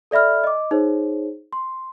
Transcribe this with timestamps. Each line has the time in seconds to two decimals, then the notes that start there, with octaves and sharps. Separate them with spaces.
0.11 A4 D5 E5 B5 F6
0.44 D#5 D6
0.71 D#4 G#4 C5 C#5
1.53 C6